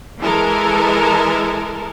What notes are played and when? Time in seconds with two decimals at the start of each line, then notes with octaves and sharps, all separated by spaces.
0.21 E3 G#3 A4 A#4